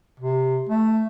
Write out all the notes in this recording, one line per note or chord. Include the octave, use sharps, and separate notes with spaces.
C3
A3